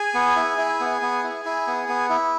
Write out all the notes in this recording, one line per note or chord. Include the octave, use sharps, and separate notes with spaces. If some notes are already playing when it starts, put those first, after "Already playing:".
Already playing: G#4 G#5
B3
E4
E4
B3
B3
E4
E4
B3
B3
E4